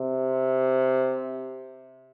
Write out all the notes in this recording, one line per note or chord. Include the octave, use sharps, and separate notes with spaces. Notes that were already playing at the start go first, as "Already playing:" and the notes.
Already playing: C3